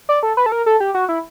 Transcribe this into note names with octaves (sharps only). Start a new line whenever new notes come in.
D5
A4
B4
A4
A#4
A4
G4
F#4
E4